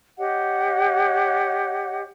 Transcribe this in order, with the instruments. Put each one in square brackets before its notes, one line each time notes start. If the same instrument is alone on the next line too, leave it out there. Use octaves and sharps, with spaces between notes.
[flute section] G4 C#5 D#5 F#5